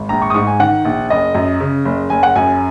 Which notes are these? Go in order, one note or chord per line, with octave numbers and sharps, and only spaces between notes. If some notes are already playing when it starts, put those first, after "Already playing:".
Already playing: G#1
A#1 A#5
C#6
D#6
G#2 C#6
G#5
D#3 F#5
A#1
F#1 D#5
F#2
C#3
F#1
F#1 G#5
F#5
F#2 G#5